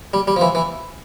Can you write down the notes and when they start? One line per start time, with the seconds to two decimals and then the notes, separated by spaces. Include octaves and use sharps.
0.14 G3
0.28 G3
0.36 F3
0.41 E3
0.55 E3